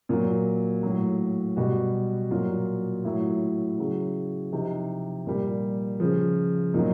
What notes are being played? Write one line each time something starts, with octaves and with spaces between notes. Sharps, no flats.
A#2 F#3
A2 F#3
B2 G3 F#4
A#2 F#3 F4
A2 F#3 E4
C#3 F#3
C3 F3 D#4
A#2 G3
C#3 F3
A#2 F#3 D#4